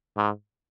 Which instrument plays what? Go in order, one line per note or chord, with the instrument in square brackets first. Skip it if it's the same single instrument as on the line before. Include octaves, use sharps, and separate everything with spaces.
[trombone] G#2